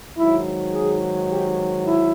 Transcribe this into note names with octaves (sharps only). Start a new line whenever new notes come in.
G#2 D#3 F#3 E4
G#4
G4
E4